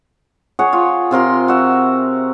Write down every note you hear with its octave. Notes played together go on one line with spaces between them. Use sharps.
G#4 C#5 F#5
F4
C3 F4 A#4 C6
F#4 E5